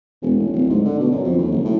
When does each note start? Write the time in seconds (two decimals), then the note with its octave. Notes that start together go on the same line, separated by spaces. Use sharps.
0.22 E1
0.39 A1
0.53 D1
0.69 G#2
0.85 D3
0.99 B2
1.11 F#2
1.24 F2
1.38 D#2
1.51 F#1
1.65 A2